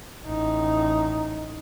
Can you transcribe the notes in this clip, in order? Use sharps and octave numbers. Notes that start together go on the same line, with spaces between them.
A1 D#4